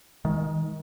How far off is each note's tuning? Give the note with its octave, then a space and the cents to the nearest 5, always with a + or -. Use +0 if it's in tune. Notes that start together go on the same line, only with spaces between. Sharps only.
D#3 +20 G#3 -15